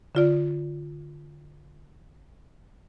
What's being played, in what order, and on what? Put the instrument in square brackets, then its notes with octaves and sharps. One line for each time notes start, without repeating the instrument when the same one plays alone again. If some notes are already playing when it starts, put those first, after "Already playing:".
[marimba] D3 F4 D5